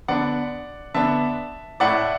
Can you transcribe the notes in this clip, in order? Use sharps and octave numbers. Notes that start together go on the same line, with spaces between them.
D3 B3 D4 D5 F#5
D3 B3 D4 E5 A5
A2 A3 E4 D5 F#5